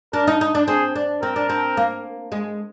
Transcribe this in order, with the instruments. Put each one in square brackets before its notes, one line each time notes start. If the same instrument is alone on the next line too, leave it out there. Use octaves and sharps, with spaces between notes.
[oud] D4 [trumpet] A#4
[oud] D#4
D#4
D4
[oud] C4 [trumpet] G#4
[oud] D4
[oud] C4 [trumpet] A#4
[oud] D4
C4
A#3
G#3